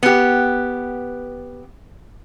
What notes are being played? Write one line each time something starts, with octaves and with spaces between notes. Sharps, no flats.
B3 G4